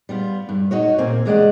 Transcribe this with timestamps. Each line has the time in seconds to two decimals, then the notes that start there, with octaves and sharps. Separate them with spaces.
0.09 G3 B3 F4
0.49 G2
0.71 D#4 F#4 C#5
0.98 A#2 A#3 C4 G#5
1.25 E2 C#3 G#3 G4 D5 F#5